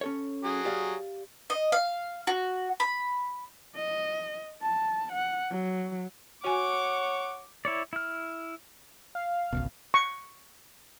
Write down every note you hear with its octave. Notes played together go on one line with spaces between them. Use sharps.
C#4 A4 C#5
F#3 G#4
G4 D5 F5
D#5
F5
F#4
B5
D#5
A5
F#5
F#3
F#4 C#5 F#5 G#5 D6
E4 C#5 D5
E4 F6
F5
G#1 C#2 B2
C#6